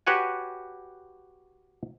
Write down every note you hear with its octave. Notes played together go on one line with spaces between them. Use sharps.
F#4 G4 B4 C#5 F#5 G#5